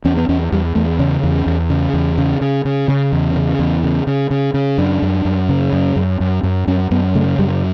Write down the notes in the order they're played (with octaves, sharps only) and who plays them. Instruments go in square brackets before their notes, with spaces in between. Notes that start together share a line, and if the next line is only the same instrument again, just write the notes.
[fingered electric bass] E2 C#4
B3
E2 C#4
E2 G3
E2 A3
C#3 C#4
E2
E2
C#3
E2
C#3
C#3
C#3
C#3 C#4
E2
C#3
E2
C#3
C#3
C#3
C#3
F#2 D4
F#2
F#2
C#3
F#2
F#2
F#2
F#2
F#2 C#4
F#2 B3
C#3 A3
F#2 G3